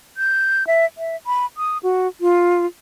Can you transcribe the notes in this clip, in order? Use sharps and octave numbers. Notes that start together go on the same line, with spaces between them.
G6
E5
E5
B5
D#6
F#4
F4